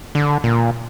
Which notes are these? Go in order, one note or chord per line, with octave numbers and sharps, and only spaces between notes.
D3
A#2